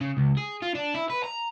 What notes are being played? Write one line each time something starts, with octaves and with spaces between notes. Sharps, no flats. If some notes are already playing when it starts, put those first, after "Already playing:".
C#3
C#2
G#4
F4
D4
E4
B4
A#5